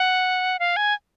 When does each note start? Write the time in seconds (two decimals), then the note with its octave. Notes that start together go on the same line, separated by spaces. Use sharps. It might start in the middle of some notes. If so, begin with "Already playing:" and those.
Already playing: F#5
0.59 F5
0.76 G#5